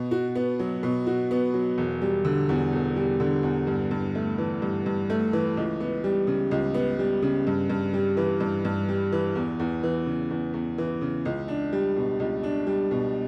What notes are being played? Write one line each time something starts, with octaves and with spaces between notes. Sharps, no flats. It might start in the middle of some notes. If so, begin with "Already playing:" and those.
Already playing: B2
F#4
B3
F#3
B2
F#4
B3
F#3
E1
G3
D3
E2
E1
G3
D3
E2
G2
G2
A3
E3
G2
G2
A3
E3
C#2
B3
G3
C#3
C#2
B3
G3
C#3
G2
G2
G3
E3
G2
G2
G3
E3
E2
E2
E3
C#3
E2
E2
E3
C#3
C#2
D4
G3
B2
C#2
D4
G3
B2